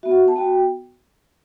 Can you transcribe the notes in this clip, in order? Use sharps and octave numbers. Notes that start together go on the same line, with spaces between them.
B3 F#4 E5
F#5
A5
B3 F#4 G5